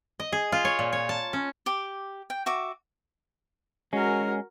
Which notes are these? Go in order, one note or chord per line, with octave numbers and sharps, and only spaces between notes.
D#5
G#4
F4
C#5
A#2
C#5
A5
C#4
G4 D6
G5
F#4 E5 D6
G#3 C#4 F#4 A#4